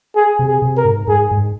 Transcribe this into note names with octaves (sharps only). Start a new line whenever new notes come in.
G#4
C3
G#4
C3
A#4
G#2
G#2 G#4
G#2